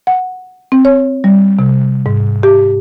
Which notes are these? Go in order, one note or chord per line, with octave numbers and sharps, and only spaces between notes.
F#5
C4
C#5
G3
C3
G#2
G4